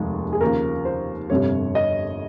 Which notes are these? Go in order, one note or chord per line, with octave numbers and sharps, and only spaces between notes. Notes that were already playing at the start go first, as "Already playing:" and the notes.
Already playing: F1 D#2 D#3 G#3
G#4
D#2 C#3 F3 A#4
C5
G1 F2 C3 G3 C#5
D#5